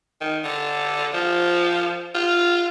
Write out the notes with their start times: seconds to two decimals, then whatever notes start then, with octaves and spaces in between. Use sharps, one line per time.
0.21 D#3
0.44 D3
1.13 F3
2.15 F4